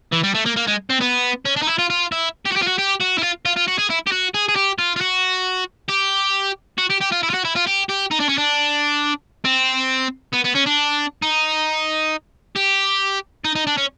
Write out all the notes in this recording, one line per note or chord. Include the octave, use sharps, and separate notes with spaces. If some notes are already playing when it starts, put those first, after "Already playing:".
E3
G3
A3
A#3
A#3
G#3
C4
B3
C#4
D4
D#4
E4
F4
F4
E4
G4
F#4
G4
F4
F#4
G4
F#4
E4
F4
F4
F4
F#4
G#4
E4
G4
F#4
G#4
G#4
G4
F4
F4
F#4
G4
F#4
G4
G4
F4
E4
F4
F#4
E4
F4
G4
G4
D#4
D4
C#4
D4
C4
B3
B3
C#4
D4
D#4
G4
D#4
D#4
D4
C#4